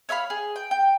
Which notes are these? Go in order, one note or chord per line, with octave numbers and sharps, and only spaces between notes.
C#5 E5 F5 B5
G#4
G5
G5